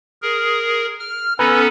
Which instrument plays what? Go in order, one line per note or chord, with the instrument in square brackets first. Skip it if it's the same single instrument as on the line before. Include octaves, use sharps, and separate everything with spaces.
[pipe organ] G#4 A#4
F6
[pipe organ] B3 C#4 A4 [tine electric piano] B4 G#5 A#5